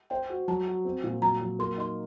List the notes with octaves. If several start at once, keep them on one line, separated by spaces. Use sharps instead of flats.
C5 G5
F#4
F#3 A5
F#4
C4
A#2
F#3 A#5
F#3
A#3 C6
D#4 C6